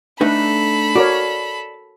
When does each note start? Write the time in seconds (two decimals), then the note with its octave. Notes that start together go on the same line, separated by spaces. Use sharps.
0.21 A3 D4 D#4 A4 B4 B5
0.96 F#4 A#4 C#5 D5